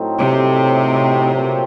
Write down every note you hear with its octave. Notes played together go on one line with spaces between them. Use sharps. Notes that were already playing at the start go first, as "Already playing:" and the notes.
Already playing: A2 F#3 A3 C4 D#4
C3
A#2 F#3 A3 C4